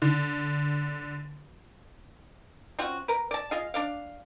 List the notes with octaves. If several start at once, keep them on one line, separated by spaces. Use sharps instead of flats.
D3
C4 C#4 F4 F#4
A#4 B4
D5 A5
F4 G#4 D#5 F5
D4 D5 F5